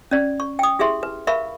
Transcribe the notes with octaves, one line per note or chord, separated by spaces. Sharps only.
C#4 D5
C#6
G5 D#6
E4 G4 G#4 E5 C6
B4
A#4 B4 E5 F5 B5 C#6